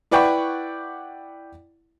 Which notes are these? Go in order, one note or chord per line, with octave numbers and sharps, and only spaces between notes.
E4 B4 D5 F#5 G5 C#6